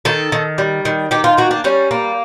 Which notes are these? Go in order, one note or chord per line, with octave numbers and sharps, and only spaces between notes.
D#3 A4
D#3
G3
D#3
D#3 G4
F4
A#3 F#4
D4
G3 C#4
A#3